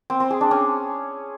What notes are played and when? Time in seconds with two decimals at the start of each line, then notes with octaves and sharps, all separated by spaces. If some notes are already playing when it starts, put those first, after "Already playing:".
0.10 C4
0.20 C4
0.30 G#4
0.41 D4
0.51 C#4